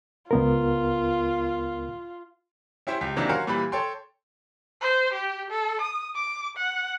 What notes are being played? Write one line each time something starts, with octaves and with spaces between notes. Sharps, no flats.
C#2 B3 F4 A#4
C#4 E4 G4 C5 G5
C#2 G4 B6
C3 D#3 E3 F#3 A#3 D4
C#4 F#4 A#4 C5 F5 F#5
A#2 E3 G3 B5
A4 C#5 G5 C6
C5
G4
A4
D#6
D6
F#5